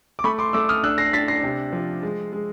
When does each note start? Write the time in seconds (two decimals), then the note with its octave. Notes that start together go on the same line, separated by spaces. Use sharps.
0.19 D6
0.24 A3 B5 C#6
0.39 C6 D6
0.53 A3 D6 E6
0.69 D#6 F6
0.83 D4 E6 F#6
0.98 A#6 C7
1.13 D4 A6 B6
1.28 A#6 C7
1.43 C3
1.73 F3
2.03 G#3
2.33 G#3